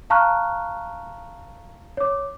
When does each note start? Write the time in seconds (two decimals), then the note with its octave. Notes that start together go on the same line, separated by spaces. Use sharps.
0.10 F5 A5 A#5 C#6 F6 F#6
1.97 C#5 D6